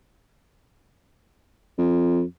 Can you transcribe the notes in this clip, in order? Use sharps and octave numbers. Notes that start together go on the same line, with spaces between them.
F2